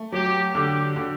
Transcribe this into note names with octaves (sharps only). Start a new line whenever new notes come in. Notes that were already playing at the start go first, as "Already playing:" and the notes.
Already playing: A3
F#3 G4
D3 G4
D3